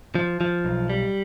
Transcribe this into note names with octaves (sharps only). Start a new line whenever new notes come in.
F3
F3
B1
G3